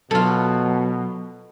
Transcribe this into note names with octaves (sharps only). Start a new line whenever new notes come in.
B2 F#3 F4 A4